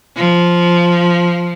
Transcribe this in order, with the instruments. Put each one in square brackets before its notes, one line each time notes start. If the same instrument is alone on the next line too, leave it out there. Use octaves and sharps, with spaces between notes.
[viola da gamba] F3